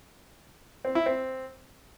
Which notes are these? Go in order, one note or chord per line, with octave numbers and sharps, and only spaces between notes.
C4
E4
C4